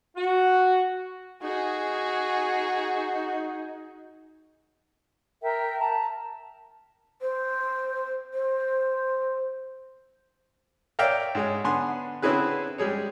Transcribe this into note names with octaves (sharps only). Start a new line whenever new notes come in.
F#4
D#4 F#4 G#4
A#4 E5 G5
A5 A#5
C5
C5
A#4 C#5 D5 E5 F5 G5
G#2 G#3 C#5
D3 B3 G#5 C6
D3 C4 C#4 E4 G#4 B4
G3 G#3 G#4 C#5